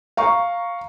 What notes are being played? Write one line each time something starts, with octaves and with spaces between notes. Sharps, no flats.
F5 A#5 C#6